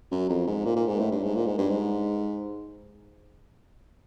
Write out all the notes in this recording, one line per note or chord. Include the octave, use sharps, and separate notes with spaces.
F#2
F2
G#2
A#2
A#2
G#2
A2
G2
G#2
A#2
G#2
G2
G#2